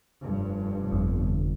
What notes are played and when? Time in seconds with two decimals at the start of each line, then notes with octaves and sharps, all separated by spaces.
0.22 F1 G2
0.92 G1 F2